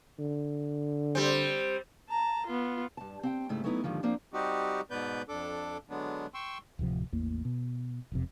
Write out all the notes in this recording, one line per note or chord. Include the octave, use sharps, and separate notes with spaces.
D3
G3 C4
A5 A#5
B3 F4
G2 A5
C4 F#5 G5
G#2 C#3 A3 E4
F#3 A3 B3 D#4 E4
D#2 G#2 D3 D#3 F3
F3 A#3 C4 D4
G3 C4 D#4 F#4 G4
G#2 B2 B3 B4 D5 G6
F2 D4 A4 D6
D3 F#3 G#3 B3 D4
G5 C6 C#6 E6
D1 A2 C3 F3
A1 E2 A2 A#3
B2
E1 F2 C3